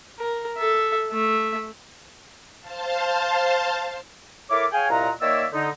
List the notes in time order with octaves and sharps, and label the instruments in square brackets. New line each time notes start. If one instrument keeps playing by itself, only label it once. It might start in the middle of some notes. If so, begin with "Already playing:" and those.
[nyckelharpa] A#4
A4 E5
A3 E5
[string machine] C5 F5 A5
[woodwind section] E4 A4 A#4 C#5 E5 D6
G#4 C#5 F5 G5 G#5
C2 A#2 D#5 F5 F#5 A#5
D#3 A#3 C#5 D5 E5 E6
D3 D#4